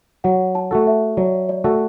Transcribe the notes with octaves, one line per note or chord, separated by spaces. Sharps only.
F#3 F#5
A5
A3 F#4 A4
E5
F#3 D5
D5
A3 F#4 A4